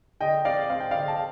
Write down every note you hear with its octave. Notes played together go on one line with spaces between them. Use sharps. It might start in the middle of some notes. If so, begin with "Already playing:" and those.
D3 D#5 G5
C4 D5 F5
C4 F5
G5
D3 D5 F5
A5